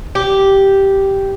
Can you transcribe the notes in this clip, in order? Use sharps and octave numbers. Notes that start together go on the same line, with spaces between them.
G4